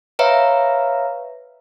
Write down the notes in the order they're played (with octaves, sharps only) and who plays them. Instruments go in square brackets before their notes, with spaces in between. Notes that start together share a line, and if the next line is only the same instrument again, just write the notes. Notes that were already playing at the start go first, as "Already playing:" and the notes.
[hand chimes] B4 C#5 E5 F5 A#5